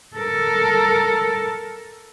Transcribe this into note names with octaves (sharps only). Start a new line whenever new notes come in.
A4 A#4